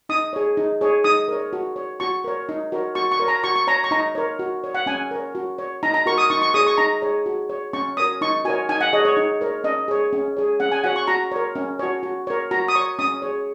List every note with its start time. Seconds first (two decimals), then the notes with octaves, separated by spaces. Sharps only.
0.09 D#4 D#6
0.33 G#4 C#5
0.57 D#4
0.81 G#4 C#5
1.04 D#4 D#6
1.28 A#4 C#5
1.53 F#4
1.76 C#5
2.00 F#4 C#6
2.24 A#4 C#5
2.49 D#4
2.72 F#4 A#4 C#5
2.95 F#4 C#6
3.12 C#6
3.20 A#4 C#5
3.28 A#5
3.44 F#4 C#6
3.56 C#6
3.67 C#5 A#5
3.84 C#6
3.91 D#4 A#5
4.15 A#4 C#5
4.39 F#4
4.64 C#5
4.75 F#5
4.86 C#4 G#5
5.11 A#4 C#5
5.35 F#4
5.58 C#5
5.83 D#4 A#5
5.94 A#5
6.06 F#4 A#4 C#6
6.18 D#6
6.30 D#4 C#6
6.42 C#6
6.54 G#4 C#5 D#6
6.67 C#6
6.78 D#4 A#5
7.02 G#4 C#5
7.26 F#4
7.50 C#5
7.73 C#4 C#6
7.97 F#4 A#4 C#5 D#6
8.21 D#4 C#6
8.45 F#4 A#4 C#5 G#5
8.69 D#4 G#5
8.81 F#5
8.93 G#4 C#5 D#5
9.05 C#5
9.17 D#4
9.41 A#4 C#5
9.64 C#4 D#5
9.88 G#4 C#5
10.13 C#4
10.37 G#4 C#5
10.60 C#4 F#5
10.72 G#5
10.84 F#4 C#5 F#5
10.96 C#6
11.07 F#4 A#5
11.32 A#4 C#5
11.55 C#4
11.79 F#4 C#5
12.03 F#4
12.27 A#4 C#5
12.51 F#4 A#5
12.68 D#6
12.75 C#5 C#6
12.99 C#4 D#6
13.22 G#4 C#5